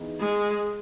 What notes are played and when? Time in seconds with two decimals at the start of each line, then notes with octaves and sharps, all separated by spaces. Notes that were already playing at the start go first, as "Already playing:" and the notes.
Already playing: E3 B3 D#4 G#4
0.19 G#3